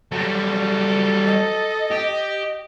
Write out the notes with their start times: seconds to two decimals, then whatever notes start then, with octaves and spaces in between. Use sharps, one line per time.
0.12 F#3 G3 A4
1.27 D#5
1.91 G4